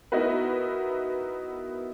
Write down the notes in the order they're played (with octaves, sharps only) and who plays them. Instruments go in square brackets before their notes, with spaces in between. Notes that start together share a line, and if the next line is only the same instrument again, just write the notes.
[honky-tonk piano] B3 D#4 E4 F#4 A#4 B4